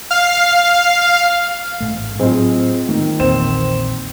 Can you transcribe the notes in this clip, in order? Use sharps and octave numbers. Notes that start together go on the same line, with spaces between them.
F5
A1 G#2 A3
A2 F#3 C4 F4 G#4 C5 D#5
D#3 A#3
A#1 E2 A#2 C4 E7